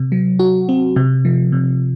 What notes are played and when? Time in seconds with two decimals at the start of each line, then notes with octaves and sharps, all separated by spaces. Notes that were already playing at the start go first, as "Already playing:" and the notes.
Already playing: C3
0.12 F#3
0.39 F#4
0.69 C4
0.96 C3
1.25 F3
1.52 C3